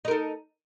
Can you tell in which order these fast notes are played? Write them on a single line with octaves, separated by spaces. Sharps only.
D#4 A#4 A4